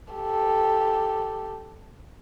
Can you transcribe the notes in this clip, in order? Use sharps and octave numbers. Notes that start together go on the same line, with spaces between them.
G4 A4